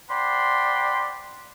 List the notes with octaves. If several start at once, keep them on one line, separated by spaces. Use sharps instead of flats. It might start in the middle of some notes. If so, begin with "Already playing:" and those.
C5 D5 F#5 G5 B5 C6